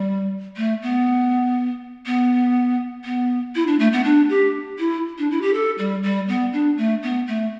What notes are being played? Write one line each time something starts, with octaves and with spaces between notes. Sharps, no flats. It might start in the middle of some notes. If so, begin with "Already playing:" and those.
Already playing: G3
A3
B3
B3
B3
E4
D4
A3
B3
D4
G4
E4
D4
E4
G4
A4
G3
G3
B3
D4
A3
B3
A3